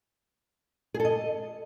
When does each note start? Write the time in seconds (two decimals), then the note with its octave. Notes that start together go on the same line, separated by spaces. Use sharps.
0.94 G#4
1.00 A4
1.05 D#5